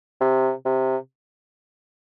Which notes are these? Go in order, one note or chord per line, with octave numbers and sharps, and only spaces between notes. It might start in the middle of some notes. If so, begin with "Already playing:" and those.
C3
C3